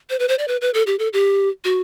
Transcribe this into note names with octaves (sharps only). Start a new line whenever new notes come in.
C5
B4
C5
D5
B4
B4
A4
G4
A4
G4
F#4